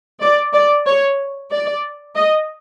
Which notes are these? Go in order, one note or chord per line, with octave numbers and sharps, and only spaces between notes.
D5
D5
C#5
D5
D#5